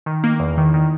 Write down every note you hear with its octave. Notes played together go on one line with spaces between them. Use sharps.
D#3
A#3
E2
D#3
D#3